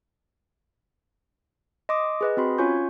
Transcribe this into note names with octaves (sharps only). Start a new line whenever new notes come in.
D#5 C6 D6 D#6
G#4 B4 D#5
C4 F#4 B5 C6
C#4 F4 C#5 G#5 C#6 G6